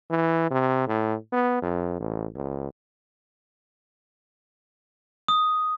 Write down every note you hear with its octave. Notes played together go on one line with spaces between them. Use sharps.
E3
C3
A2
B3
F2
A1
C#2
D#6